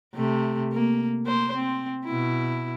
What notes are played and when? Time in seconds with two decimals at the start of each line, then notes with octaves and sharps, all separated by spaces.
0.15 C3 A3
0.73 A#3
1.25 A#3 C5
1.56 C4
2.05 B2 E4